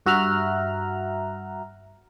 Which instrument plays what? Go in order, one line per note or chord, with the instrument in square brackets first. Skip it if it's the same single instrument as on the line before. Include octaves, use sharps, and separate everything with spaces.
[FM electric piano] G2 F#4 E5 A#5 F6 F#6